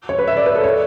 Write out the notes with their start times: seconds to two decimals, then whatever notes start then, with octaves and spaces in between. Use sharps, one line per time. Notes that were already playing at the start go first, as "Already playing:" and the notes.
0.09 C#5
0.19 B4
0.28 E5
0.37 D5
0.46 B4
0.55 A4
0.64 C#5